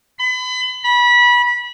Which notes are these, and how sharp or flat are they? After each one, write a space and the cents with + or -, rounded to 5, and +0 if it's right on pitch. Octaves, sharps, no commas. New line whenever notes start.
B5 +35
B5 -25